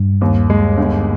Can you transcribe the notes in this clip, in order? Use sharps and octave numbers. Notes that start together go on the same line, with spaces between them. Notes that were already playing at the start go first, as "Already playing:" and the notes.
Already playing: G2
D#2
G#3
G1